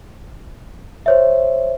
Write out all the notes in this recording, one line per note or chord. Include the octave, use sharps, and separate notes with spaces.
C5 C#5 E5